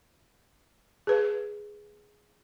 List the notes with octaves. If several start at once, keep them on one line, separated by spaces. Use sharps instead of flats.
G#4 B4